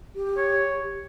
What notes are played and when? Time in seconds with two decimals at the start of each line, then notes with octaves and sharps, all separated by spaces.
0.15 G4
0.37 C#5